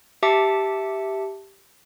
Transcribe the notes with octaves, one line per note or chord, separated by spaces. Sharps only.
G4 E5 A5 D6 C#7